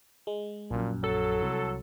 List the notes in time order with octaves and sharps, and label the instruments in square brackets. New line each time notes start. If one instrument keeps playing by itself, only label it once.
[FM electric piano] G#3
[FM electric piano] A#1 F#2 [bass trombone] A#2
[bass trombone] F#3 [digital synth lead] A4
[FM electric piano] C2